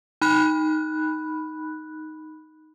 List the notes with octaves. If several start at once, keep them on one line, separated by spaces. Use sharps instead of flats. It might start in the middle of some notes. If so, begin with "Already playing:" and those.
D#4 B5 F#6